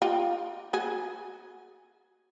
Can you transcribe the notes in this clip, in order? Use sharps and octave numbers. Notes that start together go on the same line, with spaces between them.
F4 G4
F#4 G#4